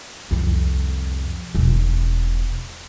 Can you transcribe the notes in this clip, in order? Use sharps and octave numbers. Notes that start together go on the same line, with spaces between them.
C2 F2
E1 D#4